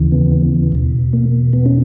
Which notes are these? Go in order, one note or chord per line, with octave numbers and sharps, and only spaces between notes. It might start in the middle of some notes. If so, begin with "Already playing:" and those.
Already playing: D#2 C#3 E3
B3
E2 B2
A#3
B3
C#4